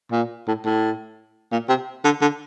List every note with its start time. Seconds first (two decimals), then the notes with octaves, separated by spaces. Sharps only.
0.11 A#2
0.47 A2
0.65 A2
1.52 A#2
1.69 C3
2.04 D3
2.21 D3